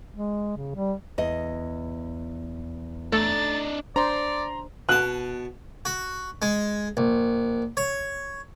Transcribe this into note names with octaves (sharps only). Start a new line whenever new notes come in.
G#3
C#3
G3
E2 D#5
A3 D4 D#4 A4 A6
D4 C5 D5 A#5 C6
B2 A5 F#6
F#4
G#3
A#1
C#5